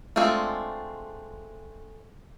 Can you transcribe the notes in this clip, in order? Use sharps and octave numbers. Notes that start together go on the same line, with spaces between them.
G#3 A3 C4 D4 F4